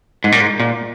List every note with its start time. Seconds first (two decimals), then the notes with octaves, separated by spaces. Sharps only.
0.24 G#2
0.32 A#2
0.40 G#2
0.60 A#2